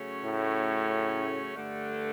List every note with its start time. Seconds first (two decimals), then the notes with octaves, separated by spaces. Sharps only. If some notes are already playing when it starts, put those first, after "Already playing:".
Already playing: C#3 F#3 A3 C#4
0.24 A2
1.55 G2 D3 A3